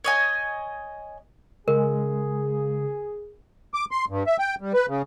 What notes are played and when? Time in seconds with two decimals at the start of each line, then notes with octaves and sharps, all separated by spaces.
0.04 C#5 D#5 G#5
1.68 C#3 G#3 G#4 A#4
3.74 D6
3.91 C6
4.09 G2
4.27 E5
4.39 G5
4.61 G3
4.74 B4
4.88 C#3